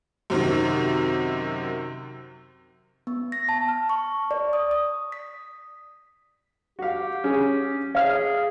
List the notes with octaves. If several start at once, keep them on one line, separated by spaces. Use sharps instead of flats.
F#2 C3 D#3
B3
A#6
A5
F6
C#6
D5
D#6
D#6
B6
F#4 G4 F5
C#4 G#4
G#4 C#5 E5 F5 F6